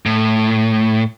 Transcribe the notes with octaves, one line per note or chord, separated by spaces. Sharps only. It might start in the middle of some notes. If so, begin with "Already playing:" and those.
A2